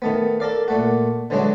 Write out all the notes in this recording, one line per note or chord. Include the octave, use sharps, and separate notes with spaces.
D#3 A3 B3
A4 A#4 D5 F5
A#2 A3 F#4
D3 E3 F#3 G#3 D4 F#4